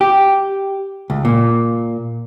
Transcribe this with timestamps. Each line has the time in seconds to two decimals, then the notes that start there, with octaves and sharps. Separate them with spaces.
0.01 G4
1.10 C#2
1.25 A#2